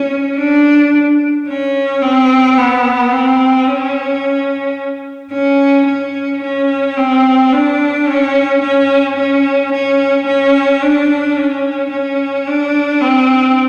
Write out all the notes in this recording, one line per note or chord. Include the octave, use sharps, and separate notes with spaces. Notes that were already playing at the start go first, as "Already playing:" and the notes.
Already playing: C#4
D4
C#4
C4
B3
C4
C#4
C#4
C#4
C#4
C4
D4
C#4
C#4
C#4
C#4
C#4
D4
C#4
C#4
D4
C4